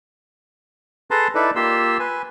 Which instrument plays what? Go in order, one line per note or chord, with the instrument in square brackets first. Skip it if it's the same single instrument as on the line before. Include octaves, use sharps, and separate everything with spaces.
[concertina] G#4 A4 B4 A5 A#5 C6
D#4 E4 A4 B4 D5
A#3 F4 G4 C6 E6
B4 G#5